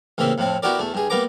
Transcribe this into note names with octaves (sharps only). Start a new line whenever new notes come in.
A1 C#3 A#3 C4 E5
F2 A2 C4
B3 E4 F#4 G4 A#4 D5
E2 A3
G2 G#4
G3 A#3 B3 A#5 D6